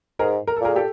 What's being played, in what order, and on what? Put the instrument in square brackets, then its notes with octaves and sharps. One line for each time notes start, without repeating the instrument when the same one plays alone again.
[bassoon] G#2 [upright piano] G#4 A#4
[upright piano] A#4
A4
[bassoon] A#2 [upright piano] G#4 A#4
[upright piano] G4 A4